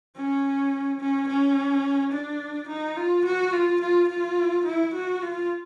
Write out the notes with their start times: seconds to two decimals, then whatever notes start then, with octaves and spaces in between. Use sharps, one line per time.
0.16 C#4
1.00 C#4
1.28 C#4
2.13 D4
2.69 D#4
2.97 F4
3.25 F#4
3.53 F4
3.81 F4
4.09 F4
4.65 E4
4.94 F#4
5.22 F4